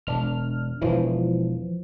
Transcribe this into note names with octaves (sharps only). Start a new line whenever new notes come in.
E1 D4 F6
E1 E2 E3 F3